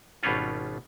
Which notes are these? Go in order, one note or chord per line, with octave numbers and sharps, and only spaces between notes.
G#1 B2 G3 B3 C#4 F4